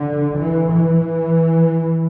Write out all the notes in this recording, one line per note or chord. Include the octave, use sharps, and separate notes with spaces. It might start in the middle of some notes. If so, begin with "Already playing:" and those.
Already playing: D3
E3
E3